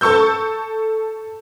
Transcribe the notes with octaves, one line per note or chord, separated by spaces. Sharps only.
A4 A5 C#6 E6 G6